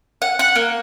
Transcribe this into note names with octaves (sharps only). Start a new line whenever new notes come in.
F#5
F#5
A#3